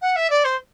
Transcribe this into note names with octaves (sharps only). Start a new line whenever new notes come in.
F#5
E5
D5
C5